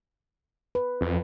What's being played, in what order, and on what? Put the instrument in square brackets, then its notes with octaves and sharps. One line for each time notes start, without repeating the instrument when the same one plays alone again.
[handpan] B4
[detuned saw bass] F2